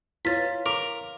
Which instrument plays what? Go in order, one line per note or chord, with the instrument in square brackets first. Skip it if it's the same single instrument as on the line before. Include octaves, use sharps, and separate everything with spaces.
[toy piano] E4 B4 C#5 [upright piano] F4 [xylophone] A6 B6
[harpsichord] A#4 [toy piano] D6 [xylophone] D7